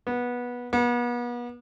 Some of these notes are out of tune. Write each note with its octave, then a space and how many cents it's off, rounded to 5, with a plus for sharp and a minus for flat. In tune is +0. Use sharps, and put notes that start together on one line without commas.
B3 -15
B3 -35